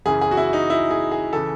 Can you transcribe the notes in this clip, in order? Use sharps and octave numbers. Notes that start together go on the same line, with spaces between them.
F#2 C#3 E3 G#4
G#4
F#4
E4
D#4
E4
G#4
G#4
C#3 E3 A4